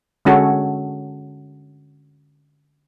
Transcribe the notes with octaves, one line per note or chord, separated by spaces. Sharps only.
D3 G#3 C#4 F#4 A4